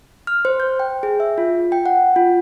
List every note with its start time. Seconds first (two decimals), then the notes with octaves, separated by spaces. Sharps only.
0.27 F6
0.45 C5
0.60 G6
0.80 G5
1.03 G#4
1.20 E5
1.38 F4
1.72 G5
1.86 F#5
2.16 F4